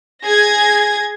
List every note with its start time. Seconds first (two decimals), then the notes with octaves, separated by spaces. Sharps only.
0.24 G#4 G#6 A#6